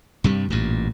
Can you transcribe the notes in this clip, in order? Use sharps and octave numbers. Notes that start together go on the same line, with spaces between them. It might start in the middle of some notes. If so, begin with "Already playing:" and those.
G2 C3 G3
A1 G2 A#2